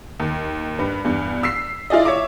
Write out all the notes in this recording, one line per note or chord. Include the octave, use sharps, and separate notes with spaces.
D#2
G2 B4
E2 G2
E6 B6 C7
E4 F4 G#4 D5 D#5
C#5 E5 D6